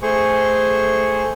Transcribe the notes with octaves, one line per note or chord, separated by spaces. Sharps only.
A3 G#4 C5 C#6